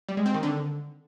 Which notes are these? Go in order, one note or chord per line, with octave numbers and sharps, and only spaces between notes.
G3
G#3
C4
D#3
D3